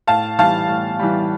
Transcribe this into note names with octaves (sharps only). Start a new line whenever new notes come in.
A2 F5 A5
E3 G3 F5 A5
A2
E3 G3